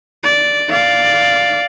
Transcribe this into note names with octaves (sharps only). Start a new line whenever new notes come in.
D5
D5 F5